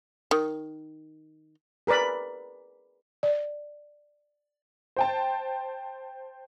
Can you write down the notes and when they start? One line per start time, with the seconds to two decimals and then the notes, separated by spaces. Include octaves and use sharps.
0.31 D#3
1.87 G#4 A#4 B4 D5 B5
3.23 D5
4.96 C5 G5 A5